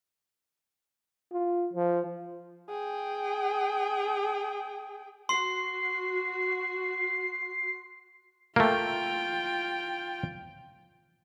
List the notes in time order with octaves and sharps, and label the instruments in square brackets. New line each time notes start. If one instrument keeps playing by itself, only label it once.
[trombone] F4
F3
[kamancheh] G#4 G5
[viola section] F#4 [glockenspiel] C6 [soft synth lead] C7
[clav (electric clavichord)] A3 A#3 [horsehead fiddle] F4 G5